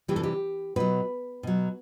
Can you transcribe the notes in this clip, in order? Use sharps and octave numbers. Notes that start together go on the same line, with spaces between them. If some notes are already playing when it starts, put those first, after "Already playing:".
C3 E3 G3 G4
A4
G4
B2 F#3 B4
B2 F#3